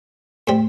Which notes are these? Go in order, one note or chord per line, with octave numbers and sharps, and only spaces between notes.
A2 G3 C4